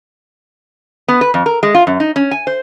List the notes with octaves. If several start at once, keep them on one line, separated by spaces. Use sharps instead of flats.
B3
B4
F2
A#4
G#3
F4
F#2
D#4
C#4
G#5
C5